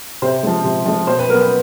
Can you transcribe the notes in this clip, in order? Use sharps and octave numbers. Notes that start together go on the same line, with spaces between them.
C3 C5
F3 G#3
C3
F3 G#3
B2 C5
B4
F#3 B3 A#4
B4